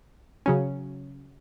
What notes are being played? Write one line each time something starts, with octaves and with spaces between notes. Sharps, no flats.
C#3 F#3 C#4